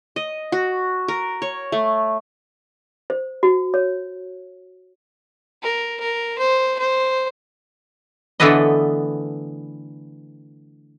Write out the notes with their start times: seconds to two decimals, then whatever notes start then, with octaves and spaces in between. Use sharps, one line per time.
0.16 D#5
0.52 F#4
1.08 A#4
1.42 C#5
1.72 A3
3.10 C5
3.43 F#4
3.74 C#5
5.62 A#4
6.00 A#4
6.38 C5
6.78 C5
8.40 D3 E3 A3 B3 B4 D#5